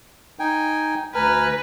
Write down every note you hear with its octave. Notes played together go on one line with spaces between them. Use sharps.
D#4 G5 G#5
D2 B4 G#5 A#5 F6